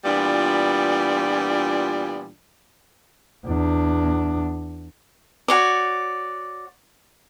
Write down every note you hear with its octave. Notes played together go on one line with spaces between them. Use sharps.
A#2 E3 G3 B3 D4 F4
E2 D4
F#4 C#5 D5